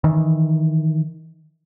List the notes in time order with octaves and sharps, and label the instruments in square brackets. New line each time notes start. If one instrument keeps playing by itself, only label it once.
[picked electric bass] D#3 E3